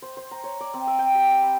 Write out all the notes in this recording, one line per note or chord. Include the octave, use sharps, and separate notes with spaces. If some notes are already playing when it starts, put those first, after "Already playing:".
C5
C5
A#5
C#5
D5
C4
E5
G5
G4
D5
B5